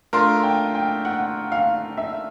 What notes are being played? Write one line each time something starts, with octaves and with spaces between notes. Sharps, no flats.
A3 D4 F4 A#4 C6
G5
G5
F#5
F5
E5